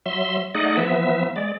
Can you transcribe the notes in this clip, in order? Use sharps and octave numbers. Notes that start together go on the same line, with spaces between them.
F#3 E5 C6
A3 D#4 G#4 D5 D#5 F#5
E3 F3 B3 E5
G#3 D5